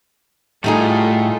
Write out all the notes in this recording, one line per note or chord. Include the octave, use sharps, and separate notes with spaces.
A2 G3 A3 D#4 F4 G#4 A4